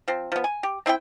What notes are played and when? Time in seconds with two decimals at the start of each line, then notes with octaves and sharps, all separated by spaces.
0.08 F3 C4
0.32 F3 B3
0.44 G#5
0.63 G4
0.86 C4 E4 D#5 G5